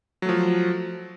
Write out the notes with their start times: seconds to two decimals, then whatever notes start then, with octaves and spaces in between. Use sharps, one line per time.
0.22 F#3
0.25 A3
0.29 F3